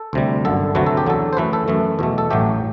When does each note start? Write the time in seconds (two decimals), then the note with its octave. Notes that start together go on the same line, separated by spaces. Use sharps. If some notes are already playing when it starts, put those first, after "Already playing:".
Already playing: A4
0.13 D2 C3 G3
0.45 G1 F#2 D3 A4
0.75 D2 C3 F#3 A3 B4
0.86 A4
0.97 G4
1.06 E2 D3 F#3 A4
1.33 C5
1.37 F#2 E3 A3 B4
1.53 A4
1.68 F#2 E3 A3
1.99 E2 B2 A3
2.18 A4
2.30 A1 A2 F#3 A3 G4